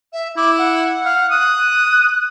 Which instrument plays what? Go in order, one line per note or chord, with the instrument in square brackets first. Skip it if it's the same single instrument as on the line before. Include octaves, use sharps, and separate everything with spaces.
[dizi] E5
[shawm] E4 [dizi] D6
[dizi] F#5
[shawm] F5
[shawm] D#6 [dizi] F#6